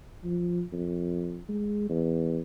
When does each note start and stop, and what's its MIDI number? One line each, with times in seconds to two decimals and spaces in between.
0.24 0.62 53
0.73 1.42 41
1.49 1.88 56
1.89 2.40 40